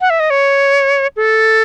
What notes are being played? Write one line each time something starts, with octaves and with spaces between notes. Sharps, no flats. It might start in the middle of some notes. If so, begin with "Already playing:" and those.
F#5
E5
D#5
C#5
A4